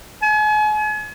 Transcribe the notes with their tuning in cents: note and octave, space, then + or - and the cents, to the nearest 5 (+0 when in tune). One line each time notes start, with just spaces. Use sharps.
G#5 +40